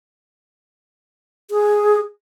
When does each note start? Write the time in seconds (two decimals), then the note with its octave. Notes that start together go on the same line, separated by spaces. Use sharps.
1.51 G#4